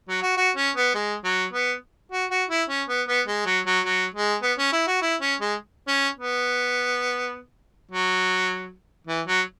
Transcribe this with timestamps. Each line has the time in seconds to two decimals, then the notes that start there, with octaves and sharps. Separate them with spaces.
0.09 F#3
0.22 F#4
0.37 F#4
0.56 C#4
0.76 B3
0.95 G#3
1.24 F#3
1.53 B3
2.12 F#4
2.30 F#4
2.49 E4
2.69 C#4
2.89 B3
3.08 B3
3.27 G#3
3.46 F#3
3.66 F#3
3.85 F#3
4.14 G#3
4.43 B3
4.58 C#4
4.72 E4
4.87 F#4
5.02 E4
5.21 C#4
5.40 G#3
5.88 C#4
6.18 B3
7.91 F#3
9.07 E3
9.27 F#3